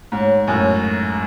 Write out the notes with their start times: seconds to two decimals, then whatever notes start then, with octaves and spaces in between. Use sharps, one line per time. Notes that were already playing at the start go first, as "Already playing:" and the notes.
0.12 G#2 C#3 F#3 C4 F#4
0.47 F#2 A2 C#3 F#3 C4 F#4
0.83 D#3 A3 C#4